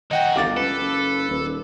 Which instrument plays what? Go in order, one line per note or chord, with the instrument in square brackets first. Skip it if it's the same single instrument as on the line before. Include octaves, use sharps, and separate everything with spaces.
[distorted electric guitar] D#3 F#4 [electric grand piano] D#5 F#5 G5
[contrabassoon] G1 [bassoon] C2 [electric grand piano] F5 D6 A6
[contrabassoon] C#2 [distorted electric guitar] A4 [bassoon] B4
[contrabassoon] F#1
D#1